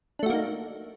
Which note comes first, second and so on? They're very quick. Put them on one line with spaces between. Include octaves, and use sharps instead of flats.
D4 A3 F#4 A#3 D#4